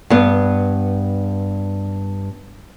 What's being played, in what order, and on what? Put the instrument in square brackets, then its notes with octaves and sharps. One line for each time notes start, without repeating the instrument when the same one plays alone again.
[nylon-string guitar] G2 B3